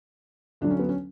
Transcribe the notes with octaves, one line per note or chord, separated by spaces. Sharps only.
D2 D3 F#3 D4
C#4
B3
C#4